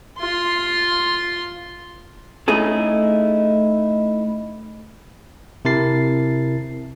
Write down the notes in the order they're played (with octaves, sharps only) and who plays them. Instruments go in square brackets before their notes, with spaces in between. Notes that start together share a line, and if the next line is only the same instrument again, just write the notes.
[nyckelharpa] F4 C6
[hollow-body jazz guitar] A3 C#4 D#4 E4 G#4 A4
[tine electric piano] C3 E4 A#4 A5 A6 C7